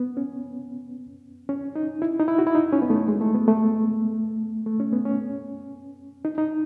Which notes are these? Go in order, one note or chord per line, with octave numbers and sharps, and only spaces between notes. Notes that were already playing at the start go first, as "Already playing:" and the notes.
Already playing: B3
C#4
C#4
D#4
E4
D#4
E4
F#4
E4
D#4
C#4
B3
A3
G#3
A3
B3
A3
A3
C#4
B3
C#4
D#4
D#4